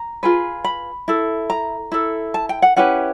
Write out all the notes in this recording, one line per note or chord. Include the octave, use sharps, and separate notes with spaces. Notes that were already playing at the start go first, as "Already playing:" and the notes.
Already playing: A#5
F4 G#4 B4
B5
E4 A4
A#5
E4 A4
A5
G5
F#5
C#4 E4 G4 B4 F#5